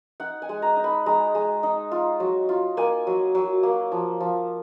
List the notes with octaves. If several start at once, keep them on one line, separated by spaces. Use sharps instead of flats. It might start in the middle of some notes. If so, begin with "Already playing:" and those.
D#4 F#5
G#5
G#3
A#5
D#4
B5
G#3 A#5
G#3
D#4
F4
F#3
F4
A#3 G#5
F#3
F#3
A#3
F3
F3